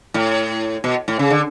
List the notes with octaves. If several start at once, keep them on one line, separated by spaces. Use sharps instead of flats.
A2
B2
A2
C#3
D3